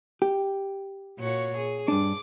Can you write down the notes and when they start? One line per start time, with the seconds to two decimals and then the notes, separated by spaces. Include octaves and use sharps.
0.22 G4
1.19 A#2 F#4 C#5
1.58 G#4
1.88 G2 D4 D6